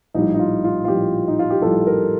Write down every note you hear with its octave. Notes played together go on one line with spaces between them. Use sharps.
A#1 A2 G3 D#4
D#4
F4
F4
F4
A#1 A2 G3 G4
D#4
F4
G4
A#1 A2 G3 A4
A#4